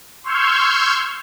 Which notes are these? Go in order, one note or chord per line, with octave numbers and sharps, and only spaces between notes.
C6 C#6 E6 F6 G6 G#6